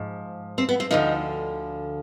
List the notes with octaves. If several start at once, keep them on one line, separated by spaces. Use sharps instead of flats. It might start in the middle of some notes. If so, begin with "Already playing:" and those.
Already playing: G#2 F3
C4
B3
C4
D2 D3 F3 D#4